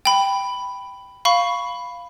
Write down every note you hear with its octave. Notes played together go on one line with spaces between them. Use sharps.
G5 B5
F5 B5 C#6